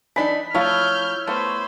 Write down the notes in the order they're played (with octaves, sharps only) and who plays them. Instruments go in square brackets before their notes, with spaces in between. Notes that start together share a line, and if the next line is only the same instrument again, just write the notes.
[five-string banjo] E3 D4 D#4 [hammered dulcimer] B5
[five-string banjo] F3 A3 F4 [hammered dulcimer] E4 C#5 [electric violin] F6 G6
[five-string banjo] A3 B3 [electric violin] C5 B5